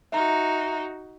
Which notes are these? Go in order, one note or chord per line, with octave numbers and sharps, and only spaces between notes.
D#4 F#4 E5 A#5